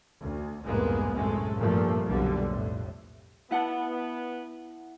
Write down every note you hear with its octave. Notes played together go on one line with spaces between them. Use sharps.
D2
C2 F2 G#2 G#3 A#3 B3
F#2 A2 C3 G#3 A3
G2 A#2 F3 A3
B1 F2 D3 G3
F2 A2
B3 E4 F#5 A5